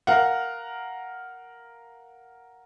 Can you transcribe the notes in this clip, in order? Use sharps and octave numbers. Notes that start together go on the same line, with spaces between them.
A#4 F5 F#5